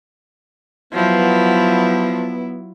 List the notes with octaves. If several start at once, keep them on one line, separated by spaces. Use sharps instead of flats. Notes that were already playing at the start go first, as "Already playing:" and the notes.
F3 F#3 B3 E4